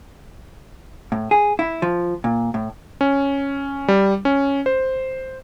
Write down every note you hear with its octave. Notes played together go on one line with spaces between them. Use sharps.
A2
G#4
E4
F3
A#2
A2
C#4
G3
C#4
C5